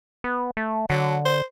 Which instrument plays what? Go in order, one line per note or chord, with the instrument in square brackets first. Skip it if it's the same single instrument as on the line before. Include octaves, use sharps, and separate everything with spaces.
[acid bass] B3
A3
[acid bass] D3 [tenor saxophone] F#3
[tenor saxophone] C5